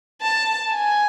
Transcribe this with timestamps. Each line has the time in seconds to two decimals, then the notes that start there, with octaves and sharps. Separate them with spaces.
0.22 A5
0.73 G#5